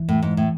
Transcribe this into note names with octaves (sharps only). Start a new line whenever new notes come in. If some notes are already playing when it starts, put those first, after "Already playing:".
Already playing: E3
A2
G#2
A2